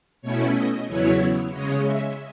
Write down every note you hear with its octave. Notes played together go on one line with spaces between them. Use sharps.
B2 A3 C#4 E4 C#5
D#5
E2 C#3 F#3 B3 E4 C#5
C#3 G#3 C#4 D#5
E5